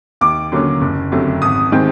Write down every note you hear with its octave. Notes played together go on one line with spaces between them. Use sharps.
D#2 D6
D3 F#3 A#3 C#4
F#1
F2 D3 F#3 A3
G#1 D#6
D#3 G#3 C4